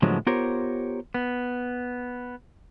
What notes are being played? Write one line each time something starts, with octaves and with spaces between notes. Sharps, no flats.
A2 D3 F3 F#3 G#3 B3
B3 F4 G4 A#4 C5 C#5
B3